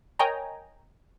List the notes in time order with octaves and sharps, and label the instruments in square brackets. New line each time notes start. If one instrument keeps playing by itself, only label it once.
[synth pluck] A#4 C#5 D#5 G5 G#5 A#5